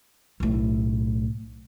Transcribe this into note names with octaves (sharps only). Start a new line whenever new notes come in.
B1 A2